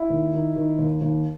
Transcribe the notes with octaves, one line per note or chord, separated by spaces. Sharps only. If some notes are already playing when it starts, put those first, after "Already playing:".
Already playing: E4
D#2
D#3
D#3
D#2
D#2